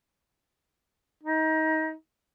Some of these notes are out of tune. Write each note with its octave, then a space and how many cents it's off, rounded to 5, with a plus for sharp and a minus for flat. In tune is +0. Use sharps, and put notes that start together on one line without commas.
D#4 +25